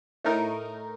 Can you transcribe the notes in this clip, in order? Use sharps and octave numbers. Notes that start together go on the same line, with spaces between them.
A2 A3 D#4 A#4